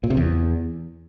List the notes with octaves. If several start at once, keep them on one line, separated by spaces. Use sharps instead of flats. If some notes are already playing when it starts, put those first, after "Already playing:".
A#2
C3
E2